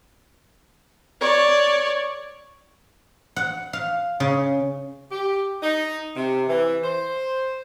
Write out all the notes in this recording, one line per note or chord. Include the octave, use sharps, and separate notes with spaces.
C#5 D5
F#5
F5
C#3
G4
D#4
C3
E3
C5